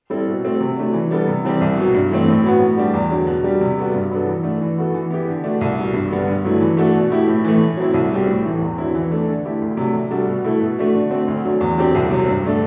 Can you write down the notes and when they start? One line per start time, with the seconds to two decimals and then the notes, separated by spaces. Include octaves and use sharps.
0.10 G3 C4 E4 A4
0.28 B2
0.44 A3 C4 F#4 A4
0.60 C3
0.77 F#3 A3 D4
0.93 E3
1.11 G3 B3 D4 A4
1.28 C3
1.44 E3 G3 C4 G4
1.61 C2
1.77 B2 F#3
1.95 G2
2.11 E3 A3 C4
2.28 A2
2.44 F#3 B3 F#4
2.60 A2
2.77 G3 D4 G4
2.94 E2
3.11 D3 F#3
3.27 B2
3.44 G3 D4 G4
3.61 C3
3.77 G3 B3 F#4 A4
3.94 G2
4.11 F#3 B3 D4 A4
4.27 E3
4.43 A3 D4 A4
4.61 E3
4.78 B3 F#4 A4
4.94 E3
5.10 B3 E4 G4
5.28 D3
5.44 A3 D4 F#4
5.61 C2
5.77 B2 G3
5.94 G2
6.11 D3 G3 B3
6.28 G2
6.44 D3 F#3 A3 E4
6.61 E3
6.77 A3 D4 F#4 A4
6.94 B2
7.10 A3 E4 G4
7.27 A2
7.44 E3 A3
7.61 A2
7.77 F#3 C4 E4
7.94 C2
8.11 B2 G3 C4 G4
8.28 A2
8.45 E3 A3
8.61 E2
8.78 D3 F#3 C4 E4
8.95 E3
9.11 A3 D4 A4
9.28 D3
9.45 A3 E4 G4
9.62 D2
9.77 C3 F#3 A3 D4
9.95 C3
10.11 G3 D4 F#4 A4
10.28 B2
10.44 A3 E4 A4
10.61 B2
10.78 A3 D4 F#4
10.95 D3
11.11 A3 C4 F#4
11.28 D2
11.45 D3 F#3
11.61 E2
11.78 D3 F#3 C4 G4
11.95 C2
12.11 C3 F#3 C4
12.28 G2
12.44 D3 A3 D4 A4